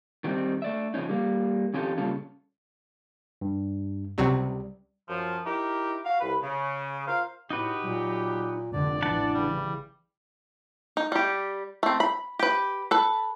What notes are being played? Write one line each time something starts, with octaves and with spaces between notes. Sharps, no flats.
D#3 F#3 G3 A3 C4 D#4
A3 D5 E5
C#3 F3 C4 C#4 D#4
G3 A#3
F2 D#3 C#4 F4 G4 A4
A#2 C#3 G3 C#4 F4 A4
G2
C#2 C3 F#3 G3
F#2 F3
D#4 E4 G4 A#4
F#4 F5
C2 B4
C#3
F4 A#4 C5 F5
A2 D#4 F#4 G4 B4
A#2 F#3
F1 C#2 D3 D5
A1 E3 D4 F#5 A5
C#3 G3
D#4
G3 G4
A3 C4
B5
G4 B4
A4 B4